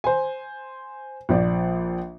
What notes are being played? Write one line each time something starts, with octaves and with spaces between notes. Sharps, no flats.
C5 G#5
A#1 F3 D5